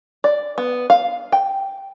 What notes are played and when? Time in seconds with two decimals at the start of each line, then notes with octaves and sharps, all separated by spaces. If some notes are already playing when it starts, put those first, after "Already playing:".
0.24 D5
0.58 B3
0.90 F5
1.32 G5